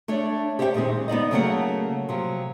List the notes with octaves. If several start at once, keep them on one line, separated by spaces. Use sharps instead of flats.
A3 D4 C#5 D5
G4 C5 D5 E5 F#5 G5
A#2 D#3 G#3 C4
B3 D#4 D5 D#5
C#3 F#3 A3 A#3 D#5 F#5
C3 F3 F#3